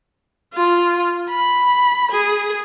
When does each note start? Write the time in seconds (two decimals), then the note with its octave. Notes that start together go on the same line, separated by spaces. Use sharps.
0.54 F4
1.29 B5
2.11 G#4